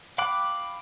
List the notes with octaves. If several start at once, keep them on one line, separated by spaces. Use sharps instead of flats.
F5 G5 B5 D6 F#6